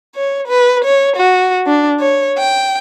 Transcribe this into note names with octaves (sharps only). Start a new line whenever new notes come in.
C#5
B4
C#5
F#4
D4
C#5
G5